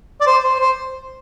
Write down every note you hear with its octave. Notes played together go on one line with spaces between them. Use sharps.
D5
C5
C5
C5